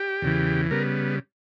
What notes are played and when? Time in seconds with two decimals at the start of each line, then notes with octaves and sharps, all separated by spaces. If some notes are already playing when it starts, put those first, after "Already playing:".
Already playing: G4
0.22 E2 C#3 E3
0.71 C#3 G3 B3 A#4